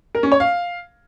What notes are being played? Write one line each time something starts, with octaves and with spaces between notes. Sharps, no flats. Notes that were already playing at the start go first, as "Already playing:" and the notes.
A#4
C#4
C#5
F5